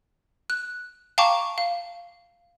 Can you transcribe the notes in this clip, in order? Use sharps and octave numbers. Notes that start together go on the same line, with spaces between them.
F#6
F5 G5 A5 A#5 C#6 D6
F5